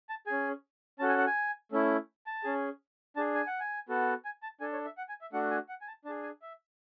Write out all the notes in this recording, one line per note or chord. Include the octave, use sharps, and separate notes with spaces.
A5
C#4 G#4 G#5
C#4 F#4 A4 A5
G#5
F#5
G#5
A3 C#4 E4
A5
C#4 G#4
D4 G#4 A5
G#5
F#5
G#5
B3 F#4 A4
G#5
A5
D4 A4 G#5
C#5
E5
F#5
G#5
E5
A3 D4 F#4 F#5
G#5
F#5
G#5
A5
D4 G#4 A5
G#5
E5